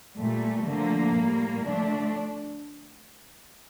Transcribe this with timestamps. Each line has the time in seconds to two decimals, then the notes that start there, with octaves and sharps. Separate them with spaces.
0.17 A#2 G3 A3
0.66 D3 F3 A3 A#3
1.15 A2 G3
1.65 D3 F3 A3 D4